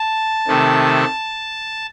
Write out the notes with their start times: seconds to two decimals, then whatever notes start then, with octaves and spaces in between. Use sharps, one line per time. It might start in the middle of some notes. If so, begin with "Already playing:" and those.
Already playing: A5
0.47 C3 D#3 A3